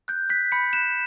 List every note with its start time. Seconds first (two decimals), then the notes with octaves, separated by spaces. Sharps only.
0.08 F#6 G6
0.30 F#6 B6
0.52 B5 C#7
0.73 F#6 E7